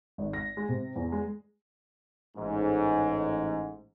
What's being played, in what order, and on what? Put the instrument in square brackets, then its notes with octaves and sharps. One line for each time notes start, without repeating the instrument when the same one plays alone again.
[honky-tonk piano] G#1
A#6
G#3
C3
E2
G#3
[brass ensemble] A1 G#2